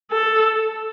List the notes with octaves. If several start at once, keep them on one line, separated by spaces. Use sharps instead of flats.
A4